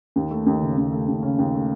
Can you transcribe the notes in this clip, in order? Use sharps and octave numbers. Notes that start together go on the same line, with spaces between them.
D#2
A3
D#2
C#3
D#2
A3
D#2
C#3
D#2
A3